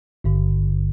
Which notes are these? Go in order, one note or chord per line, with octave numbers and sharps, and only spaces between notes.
G#1 G2 D3